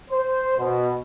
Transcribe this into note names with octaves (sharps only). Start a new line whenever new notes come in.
C5
B2